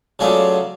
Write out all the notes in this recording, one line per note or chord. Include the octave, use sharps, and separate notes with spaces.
C#3 F#3 A3 D4 F4